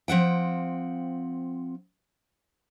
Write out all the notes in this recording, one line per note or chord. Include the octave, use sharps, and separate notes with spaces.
F3 C4 F#5 G5